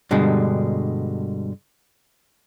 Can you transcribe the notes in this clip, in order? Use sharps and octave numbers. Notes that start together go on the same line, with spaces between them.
G2 B2 D3 G3 G#3